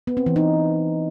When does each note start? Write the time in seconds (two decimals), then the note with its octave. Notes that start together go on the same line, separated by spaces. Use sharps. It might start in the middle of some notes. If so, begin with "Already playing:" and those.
0.07 B3
0.17 C4
0.26 E3
0.36 D#4